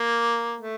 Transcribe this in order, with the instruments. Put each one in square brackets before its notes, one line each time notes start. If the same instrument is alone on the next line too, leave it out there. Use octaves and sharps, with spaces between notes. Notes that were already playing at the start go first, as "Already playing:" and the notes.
Already playing: [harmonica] A#3
A3